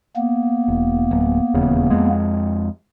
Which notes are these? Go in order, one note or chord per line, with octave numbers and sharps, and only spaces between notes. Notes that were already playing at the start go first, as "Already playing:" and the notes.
A#3 B3
E1
D1
D#1 E2 C#3
F2 G#3